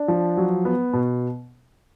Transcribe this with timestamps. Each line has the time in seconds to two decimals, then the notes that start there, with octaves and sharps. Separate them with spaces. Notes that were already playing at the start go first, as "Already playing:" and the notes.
Already playing: D4
0.08 F3
0.37 F#3
0.65 B3
0.93 B2